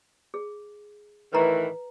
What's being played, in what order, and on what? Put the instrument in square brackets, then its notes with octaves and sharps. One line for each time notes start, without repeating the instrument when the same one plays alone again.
[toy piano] G#4
[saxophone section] A2 D#3 E3 [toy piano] B4 A#5